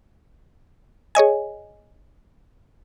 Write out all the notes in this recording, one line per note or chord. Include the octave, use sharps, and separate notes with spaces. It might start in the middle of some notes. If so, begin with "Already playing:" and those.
G#4 C#5 D#5 G#5